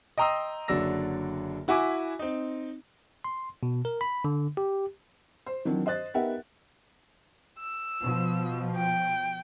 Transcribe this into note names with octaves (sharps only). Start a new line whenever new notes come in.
D#5 G5 A#5 C6 D#6 E6
F#1 D3 F#3 D5 E6 A#6
E4 F#4 E5 G#5 D6
C4 D#4
C6
B2
A#4
B5
D3
G4
C5
D#3 E3 F#3 C4 D4
C5 D#5 F#6 A6
B3 D#4 G4 A#4 E5 F#5
E6
B2 F3
G5